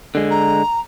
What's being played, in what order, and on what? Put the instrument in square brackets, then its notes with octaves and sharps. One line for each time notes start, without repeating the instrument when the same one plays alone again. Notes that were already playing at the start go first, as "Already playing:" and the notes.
[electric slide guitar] D3 G#3
[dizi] A#5